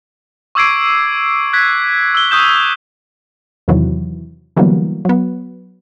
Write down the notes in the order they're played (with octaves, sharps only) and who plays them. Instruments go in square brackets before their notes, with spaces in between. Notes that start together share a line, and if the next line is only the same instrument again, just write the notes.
[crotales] C#6 D6 E6 G#6 C7 D7
F#6 G#6 B6
E6 G7
C#6 D#6 G6 E7 G7
[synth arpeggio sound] E2 C3 D#3 E3 F#3
D3 E3 F#3 G3 A#3 B3
F#3 B3